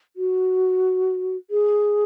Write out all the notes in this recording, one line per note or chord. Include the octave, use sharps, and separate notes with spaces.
F#4
G#4